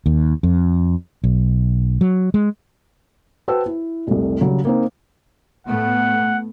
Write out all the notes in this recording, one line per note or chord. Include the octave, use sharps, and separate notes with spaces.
D#2
F2
B1
F#3
G#3
F#4 B4 C5 G5 A5 E6
E4
F1 C2
C#3 F#3 G3
A#3 C4 D#4
A2 A3 B3 F#5